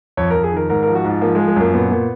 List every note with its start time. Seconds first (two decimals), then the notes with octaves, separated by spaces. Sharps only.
0.17 F2 C#5
0.31 A#4
0.35 F2
0.44 G#4
0.52 D#3 A#4
0.70 G#2 A#4
0.83 A#4
0.87 F3
0.95 F#4
1.05 G#2 F4
1.21 F3 A#3
1.35 G#3
1.39 F3
1.48 G#3
1.56 F#2 A#3
1.74 A#2 B3
1.91 A#2